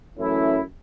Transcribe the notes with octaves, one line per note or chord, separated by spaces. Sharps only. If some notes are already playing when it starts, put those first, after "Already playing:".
F#2 E3 A3 C#4 E4